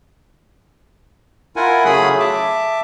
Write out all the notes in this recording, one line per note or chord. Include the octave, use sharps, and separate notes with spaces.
E4 F4 A#4 F#5 G#5
C#3 F#3 A3 G#4 B5 D#6
E5 A5 D6